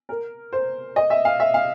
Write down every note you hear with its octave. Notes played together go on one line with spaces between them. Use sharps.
A#4
C5
D#5
E5
F5
E5
F5